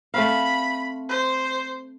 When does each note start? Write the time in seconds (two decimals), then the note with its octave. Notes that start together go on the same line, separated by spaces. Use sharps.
0.14 A3 C4 F5 B5
1.09 C5